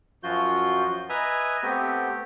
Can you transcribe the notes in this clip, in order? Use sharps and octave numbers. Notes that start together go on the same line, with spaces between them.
F#2 F3 F4 F#4 G6
B4 D#5 E5 G#5 A#5
A3 B3 C4 G4